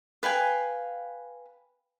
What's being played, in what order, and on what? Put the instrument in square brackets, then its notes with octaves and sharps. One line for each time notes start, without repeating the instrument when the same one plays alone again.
[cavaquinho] B4 F5 G5 G#5